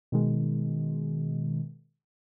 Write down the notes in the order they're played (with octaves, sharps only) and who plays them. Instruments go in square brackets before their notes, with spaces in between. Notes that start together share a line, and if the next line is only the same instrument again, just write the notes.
[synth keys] B2 D#3 G#3